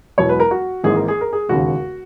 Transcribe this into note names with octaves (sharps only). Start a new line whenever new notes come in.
E1 E2 B2 F#3 C#5
B4
A#4
F#4
G#1 G#2 E3 A#3 G#4
A#4
G#4
A#4
G#4
E1 D#2 C#3 F#4